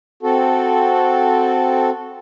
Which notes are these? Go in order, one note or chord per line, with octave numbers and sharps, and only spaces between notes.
C4 F#4 A4